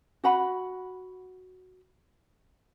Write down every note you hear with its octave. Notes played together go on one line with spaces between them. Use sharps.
F#4 F#5 B5